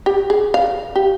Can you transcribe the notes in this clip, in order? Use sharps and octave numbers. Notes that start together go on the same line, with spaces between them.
G4
G#4
F5
G4